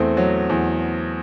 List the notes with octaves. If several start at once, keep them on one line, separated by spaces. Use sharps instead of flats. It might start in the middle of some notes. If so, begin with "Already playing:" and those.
Already playing: E2 A3 C4
F#3
E2